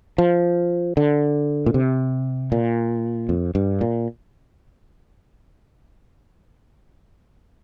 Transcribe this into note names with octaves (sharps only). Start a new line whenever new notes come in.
F3
D3
A#2
C3
A#2
F2
G2
A#2